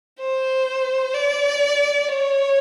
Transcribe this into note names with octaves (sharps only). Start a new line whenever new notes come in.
C5
D5
C#5